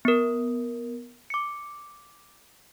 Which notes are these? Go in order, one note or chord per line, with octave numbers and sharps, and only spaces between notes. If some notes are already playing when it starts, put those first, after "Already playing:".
B3 A#4
D6 C#7